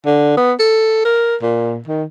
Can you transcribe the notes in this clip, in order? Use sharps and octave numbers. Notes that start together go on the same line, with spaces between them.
D3
B3
A4
A#4
A#2
D#3